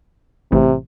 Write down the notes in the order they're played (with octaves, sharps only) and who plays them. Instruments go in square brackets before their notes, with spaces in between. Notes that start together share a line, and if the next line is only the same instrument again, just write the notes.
[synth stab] A1 [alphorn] C3